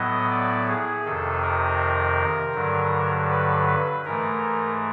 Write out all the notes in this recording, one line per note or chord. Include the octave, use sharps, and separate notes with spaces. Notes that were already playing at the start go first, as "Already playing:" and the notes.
Already playing: A2 F#3 B3 E4 D#5
D5
G#4
F2 C3 D#3 A4
A#4
G2 D3 F#3
B4
B4
G#2 E3 A3 A#4